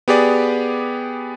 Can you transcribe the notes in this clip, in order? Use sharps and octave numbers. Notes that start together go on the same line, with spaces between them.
B3 G4 G#4 D5